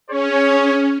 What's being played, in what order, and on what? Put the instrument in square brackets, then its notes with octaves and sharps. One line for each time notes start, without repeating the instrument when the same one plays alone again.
[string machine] C#4 [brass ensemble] G#4 C#5